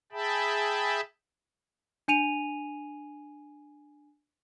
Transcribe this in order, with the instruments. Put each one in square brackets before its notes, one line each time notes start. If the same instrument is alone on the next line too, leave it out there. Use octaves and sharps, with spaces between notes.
[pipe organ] G#4 E5 G5 A5 B5
[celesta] D4 G#5 D#7 F7